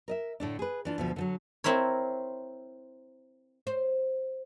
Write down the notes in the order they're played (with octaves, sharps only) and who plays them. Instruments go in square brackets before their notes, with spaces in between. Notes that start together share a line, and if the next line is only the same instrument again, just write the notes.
[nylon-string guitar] A#4 D#5 E5
A2 D3 D4
G#4 B4
E3 D4 F4
D2 B2 F3
D3 F3 F#3
[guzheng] C4 E4 A#4 C#5
[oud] C5